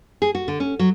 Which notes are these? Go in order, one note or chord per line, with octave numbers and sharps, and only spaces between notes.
G#4
F#4
D3
C#4
F#3